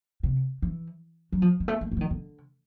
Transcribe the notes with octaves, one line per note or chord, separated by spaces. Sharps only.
C3
E3
F#3
F3
G#3
A3
G#3
A3
E3
D#3
D3